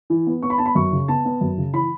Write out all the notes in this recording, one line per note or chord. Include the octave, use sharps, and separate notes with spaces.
E3
B3
B3 C#6
B5
B3 A5
B5
F#2 C#6
C#3
B3 A5
B3
F#2
C#3
E3 B5